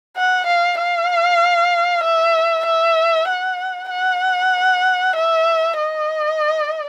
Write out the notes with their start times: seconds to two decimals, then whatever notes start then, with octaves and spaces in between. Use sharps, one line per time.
0.17 F#5
0.47 F5
0.79 F5
2.03 E5
2.66 E5
3.28 F#5
3.90 F#5
5.16 E5
5.78 D#5